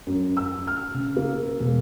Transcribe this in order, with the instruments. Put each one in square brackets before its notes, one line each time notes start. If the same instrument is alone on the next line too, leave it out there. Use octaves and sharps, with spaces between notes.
[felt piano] F#2
E6
F6
C#3
A#3
E1